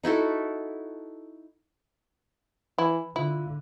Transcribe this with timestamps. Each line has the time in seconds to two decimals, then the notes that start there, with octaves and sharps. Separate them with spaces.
0.03 D#4 E4 F#4 A4
2.78 E3 E4
3.16 D3 E4 F4